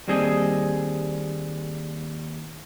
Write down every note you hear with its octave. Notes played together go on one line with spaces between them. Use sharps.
D#2 G3 C4 G#4 A4 D#5